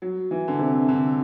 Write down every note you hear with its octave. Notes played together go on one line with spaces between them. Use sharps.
F#3
E3
D3
C3
D3